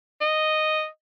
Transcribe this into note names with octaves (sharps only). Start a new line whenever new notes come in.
D#5